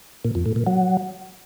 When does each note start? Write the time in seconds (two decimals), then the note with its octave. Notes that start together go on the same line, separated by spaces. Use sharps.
0.25 A#2
0.35 F2
0.46 A2
0.56 A#2
0.67 F#3